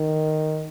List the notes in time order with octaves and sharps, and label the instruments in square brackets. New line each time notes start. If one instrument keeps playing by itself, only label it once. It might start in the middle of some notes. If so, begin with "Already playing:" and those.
Already playing: [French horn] D#3